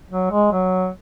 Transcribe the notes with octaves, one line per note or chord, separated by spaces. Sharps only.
F#3
G#3
F#3